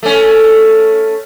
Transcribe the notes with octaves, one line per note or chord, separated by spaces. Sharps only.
A3 C#4